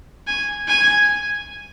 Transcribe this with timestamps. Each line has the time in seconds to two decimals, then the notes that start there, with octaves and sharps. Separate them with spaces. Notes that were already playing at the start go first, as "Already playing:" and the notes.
0.27 G#5
0.68 G#5